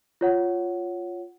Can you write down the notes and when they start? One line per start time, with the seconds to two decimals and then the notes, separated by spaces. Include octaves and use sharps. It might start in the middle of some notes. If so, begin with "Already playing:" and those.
0.21 F4 C#5 F#5